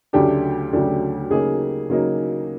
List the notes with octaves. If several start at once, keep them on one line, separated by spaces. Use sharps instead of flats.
D2 C#3 F#3 A3 D4 G4
D2 C#3 F#3 A3 D4
C#3 F#3 A#3 D#4 G#4
C#3 F#3 A#3 D#4